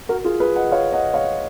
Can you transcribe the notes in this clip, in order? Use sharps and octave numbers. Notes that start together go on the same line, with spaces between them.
F#4 A#4
F4 G#4
G#4 B4
D#5 F#5
C#5 F5
D#5 F#5
C#5 F5